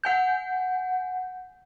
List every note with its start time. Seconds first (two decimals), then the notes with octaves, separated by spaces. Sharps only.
0.04 F#5 G#5 G6